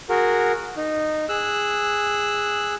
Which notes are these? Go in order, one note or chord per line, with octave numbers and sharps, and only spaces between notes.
F#4 G#4 A#4
D#4
G#4 E6 F#6